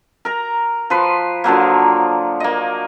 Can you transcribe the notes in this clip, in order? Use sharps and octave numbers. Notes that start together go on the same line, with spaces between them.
A#4 A#5
F3 B4 C6
D3 F3 F#3 A#3
A#3 D#5